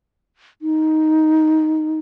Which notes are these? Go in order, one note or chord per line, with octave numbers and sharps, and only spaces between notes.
D#4